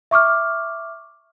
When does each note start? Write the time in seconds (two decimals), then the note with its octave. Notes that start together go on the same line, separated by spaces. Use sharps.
0.11 E5 C#6 D6 F6